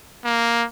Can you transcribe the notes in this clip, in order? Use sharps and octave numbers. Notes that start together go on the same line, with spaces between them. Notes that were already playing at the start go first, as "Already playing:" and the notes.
A#3